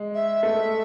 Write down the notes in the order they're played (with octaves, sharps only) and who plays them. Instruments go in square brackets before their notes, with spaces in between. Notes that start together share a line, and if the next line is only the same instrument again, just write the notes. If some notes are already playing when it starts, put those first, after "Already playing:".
Already playing: [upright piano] G#3
[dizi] E5
[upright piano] A3